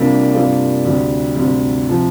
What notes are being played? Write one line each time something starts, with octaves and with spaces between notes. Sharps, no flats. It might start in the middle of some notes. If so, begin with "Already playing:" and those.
Already playing: C3 G3 A#3 D4 F4
C3 G3 A#3 D4 F4
D2 C3 G3
D2 C3 G3
C3 F3